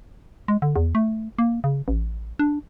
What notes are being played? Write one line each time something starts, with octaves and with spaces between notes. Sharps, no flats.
G#3
D3
E2
A3
A#3
C#3
A1
D4